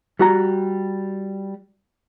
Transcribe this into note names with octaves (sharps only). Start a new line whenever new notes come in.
G3 F#4 A#5